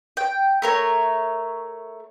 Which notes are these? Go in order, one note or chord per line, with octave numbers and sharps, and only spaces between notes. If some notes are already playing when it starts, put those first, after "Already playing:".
G5
A3 A#4 C#5